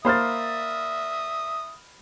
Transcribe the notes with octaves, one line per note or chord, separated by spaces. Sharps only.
A#3 C5 E5 B5 D#6 F6 A6